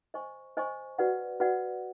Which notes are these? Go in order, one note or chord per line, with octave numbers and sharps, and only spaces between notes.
C5 D#5 G#5 C#6
C5 D#5 G#5 C#6
F#4 B4 D5 F#5
F#4 B4 D5 F#5